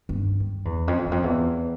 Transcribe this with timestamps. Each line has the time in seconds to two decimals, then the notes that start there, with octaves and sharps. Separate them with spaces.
0.09 G2
0.40 G2
0.65 E2
0.88 F2
1.06 E2
1.11 F2
1.24 E2